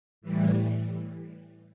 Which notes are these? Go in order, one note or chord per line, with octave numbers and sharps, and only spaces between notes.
A2 E3 G3